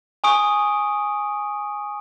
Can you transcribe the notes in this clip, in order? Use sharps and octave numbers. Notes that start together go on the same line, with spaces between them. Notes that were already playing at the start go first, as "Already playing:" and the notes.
G#5 C#6 D#6 D7